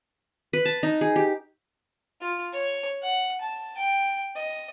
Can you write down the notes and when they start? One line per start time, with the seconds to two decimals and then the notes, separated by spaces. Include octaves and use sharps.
0.53 B4
0.65 A5
0.83 D#4
1.01 G#4
1.16 G4
2.21 F4
2.53 C#5
3.03 F#5
3.41 A5
3.78 G5
4.36 D#5